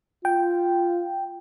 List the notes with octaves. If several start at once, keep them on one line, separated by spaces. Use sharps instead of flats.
F4 G5